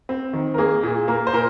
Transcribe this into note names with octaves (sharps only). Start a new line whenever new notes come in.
C4
D#3
A#4
A#3 G#4
A#2 G#4
A#3 A#4
C5
A#2 A#4